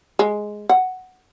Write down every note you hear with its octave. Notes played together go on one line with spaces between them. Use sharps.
G#3
F#5